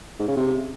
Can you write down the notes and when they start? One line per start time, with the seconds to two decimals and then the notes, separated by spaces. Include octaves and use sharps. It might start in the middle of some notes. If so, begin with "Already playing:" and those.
0.19 G#2
0.28 C#3
0.37 C3